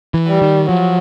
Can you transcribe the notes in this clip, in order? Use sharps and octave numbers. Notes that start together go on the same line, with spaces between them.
E3
G3
D#3
F3 F#3